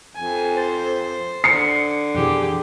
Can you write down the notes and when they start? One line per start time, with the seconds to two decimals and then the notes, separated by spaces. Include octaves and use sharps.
0.16 F2 G#5
0.57 C5 A6
1.44 D3 C7 C#7
2.15 F2 B2 E3 G4 G#4